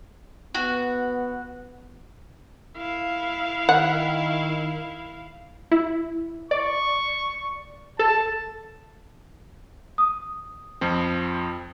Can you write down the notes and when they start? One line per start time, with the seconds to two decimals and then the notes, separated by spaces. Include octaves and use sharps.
0.55 B3 F#4
2.77 E4 F5
3.69 D#3 F#5
5.71 E4
6.51 D5 C#6
7.99 A4 A5
9.98 D#6
10.81 F2 F3 C4